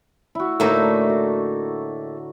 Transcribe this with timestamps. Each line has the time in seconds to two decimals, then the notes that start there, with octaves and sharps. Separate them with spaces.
0.35 E4 F#4
0.60 A2 D3 A3 A#3 D#4 A#5
1.09 F#4